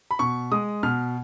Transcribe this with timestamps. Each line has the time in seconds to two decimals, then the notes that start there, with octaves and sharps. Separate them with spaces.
0.11 B5
0.19 B2 C#6
0.52 G#3 D#6
0.83 B2 F6